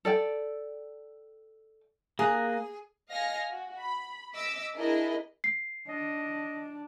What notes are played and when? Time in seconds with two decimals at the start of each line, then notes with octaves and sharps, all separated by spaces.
0.05 A4 D5 G5
2.19 A#3 G#4 A#5 F#6
3.10 D#5 F5 G#5 F6 A#6 C#7
3.50 F#4
3.79 B5
4.34 D#5 D6 E6 B6
4.75 D4 E4 G#4 A#4 D#5
5.44 C7
5.88 D4 D#5